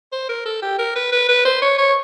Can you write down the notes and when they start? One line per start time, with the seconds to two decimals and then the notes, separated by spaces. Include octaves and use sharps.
0.12 C5
0.29 A#4
0.45 A4
0.62 G4
0.79 A#4
0.96 B4
1.12 B4
1.29 B4
1.45 C5
1.62 C#5
1.78 C#5